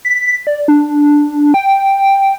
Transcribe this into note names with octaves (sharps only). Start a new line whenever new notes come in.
B6
D5
D4
G5